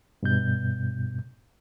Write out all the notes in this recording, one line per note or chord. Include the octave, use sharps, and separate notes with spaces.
G2 B2 G6